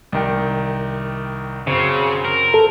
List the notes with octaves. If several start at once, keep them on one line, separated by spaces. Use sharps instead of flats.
C2 D#3 G5
F#2 C#3 C4
A#4
A4